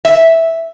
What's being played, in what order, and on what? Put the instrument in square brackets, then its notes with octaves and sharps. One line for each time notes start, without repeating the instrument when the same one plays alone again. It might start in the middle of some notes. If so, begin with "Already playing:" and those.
[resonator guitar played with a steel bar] E5